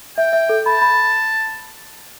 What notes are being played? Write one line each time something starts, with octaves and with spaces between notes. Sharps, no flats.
E5 G5
E5
A4
A5 B5
B5